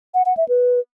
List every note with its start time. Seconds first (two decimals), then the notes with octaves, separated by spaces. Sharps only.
0.14 F#5
0.26 F#5
0.37 E5
0.49 B4